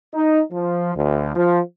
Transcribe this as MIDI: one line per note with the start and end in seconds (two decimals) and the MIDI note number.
0.14 0.41 63
0.52 0.95 53
0.96 1.31 38
1.35 1.60 53